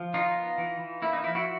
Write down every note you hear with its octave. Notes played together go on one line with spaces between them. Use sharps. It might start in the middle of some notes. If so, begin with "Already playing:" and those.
Already playing: F3
D#3 D#4 F4
B3
E3
E3
A#3 E4
D#4
F3 E4
E4 F#4